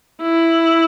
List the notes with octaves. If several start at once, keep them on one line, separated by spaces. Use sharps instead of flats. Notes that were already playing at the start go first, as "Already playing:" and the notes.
E4